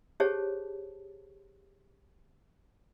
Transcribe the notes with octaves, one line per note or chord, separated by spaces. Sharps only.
G4 G#4 C5 C#5 A5